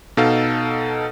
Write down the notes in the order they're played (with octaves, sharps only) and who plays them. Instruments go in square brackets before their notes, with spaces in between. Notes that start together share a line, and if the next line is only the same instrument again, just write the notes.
[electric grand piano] B2 D#4 A4 F5